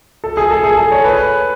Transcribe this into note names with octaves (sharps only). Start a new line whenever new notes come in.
A4
G#4
A4
G#4
A4
C#5
B4